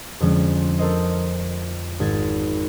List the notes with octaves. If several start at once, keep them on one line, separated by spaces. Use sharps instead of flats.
F2 D3 F3 G#3 C#4
A4 A#4 C5 D#5
G#1 G#6 A6